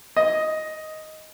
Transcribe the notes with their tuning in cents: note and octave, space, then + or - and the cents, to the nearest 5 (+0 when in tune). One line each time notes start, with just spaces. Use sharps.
D#5 +5